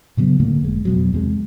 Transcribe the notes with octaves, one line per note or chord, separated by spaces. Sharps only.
A#2 C#3 F#3 B3
A2 D3 A3 A#3
F1 G#3
F2 B2 F#3
E2 C3 G#3